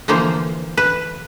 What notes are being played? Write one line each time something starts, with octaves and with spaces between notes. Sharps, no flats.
D3 E3 F3 A#3 C5
B4